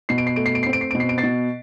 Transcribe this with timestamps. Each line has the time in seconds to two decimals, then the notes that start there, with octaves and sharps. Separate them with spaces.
0.09 B2 C7
0.18 D7
0.27 C7
0.36 A3 D7
0.46 C7
0.55 D7
0.63 C4 C7
0.73 D7
0.81 C7
0.91 B2 D7
1.00 C7
1.09 D7
1.18 A6 C7
1.24 B2